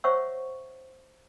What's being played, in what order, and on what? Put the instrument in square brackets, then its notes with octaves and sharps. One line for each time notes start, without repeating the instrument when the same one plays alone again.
[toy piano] C5 C#5 E5 F#5 C#6 E6